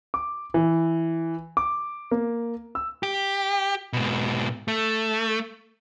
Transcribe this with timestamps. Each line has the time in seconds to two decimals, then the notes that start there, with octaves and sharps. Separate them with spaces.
0.14 D6
0.54 E3
1.57 D6
2.11 A#3
2.75 E6
3.03 G4
3.93 G#2 B2
4.68 A3